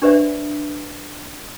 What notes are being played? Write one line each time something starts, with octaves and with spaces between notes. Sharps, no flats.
D4 G4 B4 C5 D5 E5